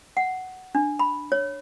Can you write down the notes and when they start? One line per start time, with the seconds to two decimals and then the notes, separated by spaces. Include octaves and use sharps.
0.17 F#5
0.75 D4
0.99 B5
1.32 C#5